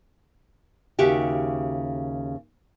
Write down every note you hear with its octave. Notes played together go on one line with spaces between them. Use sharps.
D#2 C#3 F#4 G4 E5